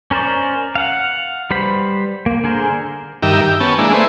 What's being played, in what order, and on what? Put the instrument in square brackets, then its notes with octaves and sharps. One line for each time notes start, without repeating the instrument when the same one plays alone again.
[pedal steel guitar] C#4 A#4 C5 D5
F5 F#5
G3 B4 C5 B5
A#3
D3 G#4 A#4 C5
[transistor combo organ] G2 D#3 G4 A#4 E5
G4
B3 C#4 A5
G#3 A#3 D4 E4
A3 E4 B4 C5